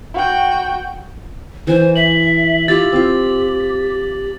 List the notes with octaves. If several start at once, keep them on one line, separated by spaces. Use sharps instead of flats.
F#4 G5
E3 C5 G#5
E5 F#7
E4 F4 G4 A6
C4 F4